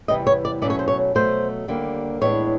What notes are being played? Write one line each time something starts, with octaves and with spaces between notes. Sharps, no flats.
E2 C3 E3 G3 B3 D#5
C#5
D5
B2 F#3 A3 C#4 D5
C#5
C5
C#5
B2 F#3 A3 C5
D#2 D3 G3 A#3
A2 E3 G#3 B3 D4 C#5